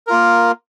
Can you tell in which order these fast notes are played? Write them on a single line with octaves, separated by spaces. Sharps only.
A#4 F4 A#3